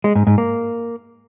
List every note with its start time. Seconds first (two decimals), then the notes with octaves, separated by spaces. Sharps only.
0.04 G#3
0.15 G#2
0.27 G#2
0.38 A#3